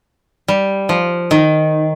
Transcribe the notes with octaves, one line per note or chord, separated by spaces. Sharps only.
G3
F3
D#3